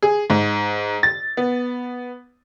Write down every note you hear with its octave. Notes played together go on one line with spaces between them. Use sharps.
G#4
G#2
A6
B3